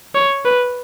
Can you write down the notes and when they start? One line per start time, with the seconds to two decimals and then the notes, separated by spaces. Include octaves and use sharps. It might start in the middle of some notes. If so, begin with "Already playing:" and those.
0.15 C#5
0.45 B4